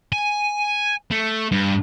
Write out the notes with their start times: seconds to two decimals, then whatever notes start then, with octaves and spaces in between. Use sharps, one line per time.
0.12 G#5
1.11 A3
1.52 G2